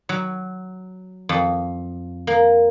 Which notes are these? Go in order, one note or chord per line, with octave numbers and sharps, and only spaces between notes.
F#3
F2
A#3